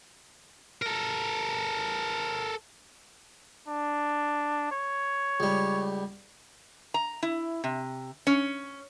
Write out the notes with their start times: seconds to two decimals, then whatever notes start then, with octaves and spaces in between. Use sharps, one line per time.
0.82 A4 A#4
3.68 D4
4.72 C#5
5.40 C#2 G3
6.94 A#5
7.23 E4
7.64 C3
8.27 C#4